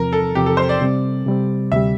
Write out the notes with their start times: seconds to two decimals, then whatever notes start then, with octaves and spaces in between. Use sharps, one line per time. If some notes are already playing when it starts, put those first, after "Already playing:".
Already playing: E2 C3 F3 C4 A#4
0.13 A4
0.35 E2 C3 F3 C4 G4
0.46 A4
0.57 C5
0.69 D5
0.81 C3 G3 C4
1.26 C3 G3 C4
1.72 D2 C3 G3 E5